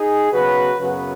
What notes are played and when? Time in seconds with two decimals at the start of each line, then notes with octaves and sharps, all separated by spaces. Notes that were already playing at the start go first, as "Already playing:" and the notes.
Already playing: D#4 G#4
0.32 C#3 F#3 B3 F#4 B4
0.81 F#2 C#3 F#3 B3 F#4 B4